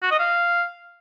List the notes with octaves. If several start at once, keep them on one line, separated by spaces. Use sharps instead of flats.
F#4
D#5
F5